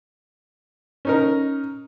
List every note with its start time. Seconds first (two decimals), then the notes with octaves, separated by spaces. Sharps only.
1.05 C#4 D#4 A#4